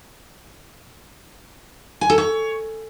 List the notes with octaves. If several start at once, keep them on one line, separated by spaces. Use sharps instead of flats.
G#5
A4
C#5